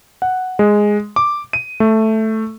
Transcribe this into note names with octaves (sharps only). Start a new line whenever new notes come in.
F#5
G#3
D6
D#7
A3